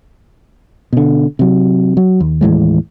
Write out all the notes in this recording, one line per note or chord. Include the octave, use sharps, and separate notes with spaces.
B2 D3
C3 F#3
F#3
D#2
D#2 A2 E3 G#3